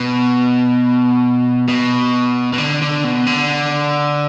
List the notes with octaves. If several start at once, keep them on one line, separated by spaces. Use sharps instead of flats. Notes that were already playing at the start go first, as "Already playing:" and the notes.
Already playing: B2
B2
B2
D3
D3
B2
D3